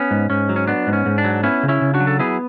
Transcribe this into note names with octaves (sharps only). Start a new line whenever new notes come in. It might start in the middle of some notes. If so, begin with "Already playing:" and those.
Already playing: B3 C#4
G#2
G#2 C#4
F#3
C#4
B3 D4
G#2
C#4
G#2
D4
F#3
B3 C#4 E4
C#3
C#4 E4
C#3
D4 F#4
F#3
A4
B3 E4 G#4